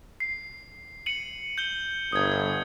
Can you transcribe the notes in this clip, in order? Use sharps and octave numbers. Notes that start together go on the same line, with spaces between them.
C7
C#7 D#7 F#7
G6 G7
G1 D#6 G#6